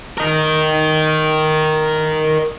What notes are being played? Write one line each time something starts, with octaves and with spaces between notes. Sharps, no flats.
A#4 D#5